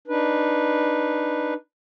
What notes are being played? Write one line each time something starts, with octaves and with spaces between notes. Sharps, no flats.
D4 D#4 B4